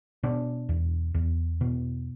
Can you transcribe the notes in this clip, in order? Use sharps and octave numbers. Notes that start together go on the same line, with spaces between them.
B2 D4
E2
E2
B2